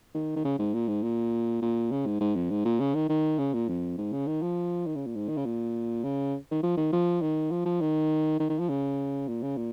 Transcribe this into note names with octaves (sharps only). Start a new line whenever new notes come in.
D#3
D#3
C#3
G#2
A#2
G#2
A#2
A#2
C#3
G#2
G#2
F2
G#2
A#2
C#3
D#3
D#3
C#3
A#2
F2
G#2
C#3
D#3
F3
D#3
C#3
A#2
G#2
D#3
C#3
A#2
C#3
D#3
F3
D#3
F3
D#3
F3
F3
D#3
D#3
D#3
F3
C#3
A#2
C#3
A#2